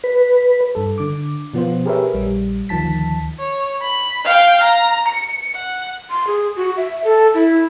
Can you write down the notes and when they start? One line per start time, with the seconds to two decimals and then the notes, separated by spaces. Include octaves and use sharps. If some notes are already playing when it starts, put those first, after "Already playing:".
0.04 B4
0.75 G2 A4
0.98 D3 D6
1.54 B2 F3 B3 F4 C5
1.86 G4 G#4 A#4 B4 C#5 E5
2.14 A#1 G3
2.69 D2 D#3 F3 A5 B6
3.40 C#5
3.82 B5
4.25 F5 G5
4.63 A#5
5.08 C#7
5.55 F#5
6.10 C6
6.27 G#4
6.56 F#4
6.77 E5
7.04 A4
7.34 E4